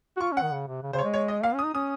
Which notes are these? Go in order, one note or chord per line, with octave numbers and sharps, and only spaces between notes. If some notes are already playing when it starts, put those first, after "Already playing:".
F#4
F4 C#6
C#4
F#5
D#3
C#3
C3
C#3
C#3 C5
C#5
G#3
C#5
D#5
A#3 F5
C#4
D#6
D#4
C#4 D#6